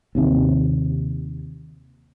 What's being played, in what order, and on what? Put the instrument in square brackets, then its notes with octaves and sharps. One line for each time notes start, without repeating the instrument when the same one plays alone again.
[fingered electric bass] D#2 C3